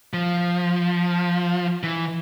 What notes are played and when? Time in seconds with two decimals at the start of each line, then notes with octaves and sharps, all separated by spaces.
0.13 F3
1.83 E3